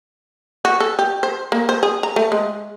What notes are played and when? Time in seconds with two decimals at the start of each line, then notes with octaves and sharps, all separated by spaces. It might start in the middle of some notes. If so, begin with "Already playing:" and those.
0.65 F#4
0.80 A4
0.99 G4
1.23 C5
1.52 A#3
1.69 C5
1.83 G#4
2.03 A#5
2.16 A3
2.32 G#3